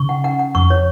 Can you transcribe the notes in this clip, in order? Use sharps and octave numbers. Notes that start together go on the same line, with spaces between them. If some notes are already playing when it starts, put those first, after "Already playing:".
Already playing: C#3 C#6
F#5
F#5
F#5
F2 C#6
C#5